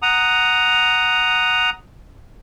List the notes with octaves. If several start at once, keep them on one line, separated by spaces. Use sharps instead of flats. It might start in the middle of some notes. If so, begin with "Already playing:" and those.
F#5 A#5 D#6